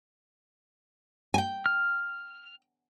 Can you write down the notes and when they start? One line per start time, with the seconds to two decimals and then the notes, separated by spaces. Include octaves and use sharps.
1.34 G5 G#5
1.66 F6